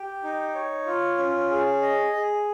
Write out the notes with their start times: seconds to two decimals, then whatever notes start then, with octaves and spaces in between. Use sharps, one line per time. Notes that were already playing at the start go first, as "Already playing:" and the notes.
Already playing: G4
0.24 D#4
0.55 C#5
0.86 F4
1.18 C#4
1.50 G#4
1.82 D#5
2.13 G#4